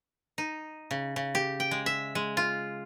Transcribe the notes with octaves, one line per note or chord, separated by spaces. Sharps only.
D#4
C#3
C#3
G4
G5
G#3
E5
G#3
F4